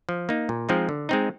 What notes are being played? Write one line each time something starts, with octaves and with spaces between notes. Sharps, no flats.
F3
A#3 D#4
A#2
F3 G#3 C4 D#4
D3
G#3 C4 D#4